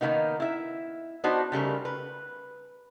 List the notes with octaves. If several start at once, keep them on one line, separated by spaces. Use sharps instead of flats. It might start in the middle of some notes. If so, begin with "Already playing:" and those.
D#3 F3 A#3 B3 D#4
E4 E5
B3 D4 D#4 F#4 C5
C#3 G3 A3 A#4
B4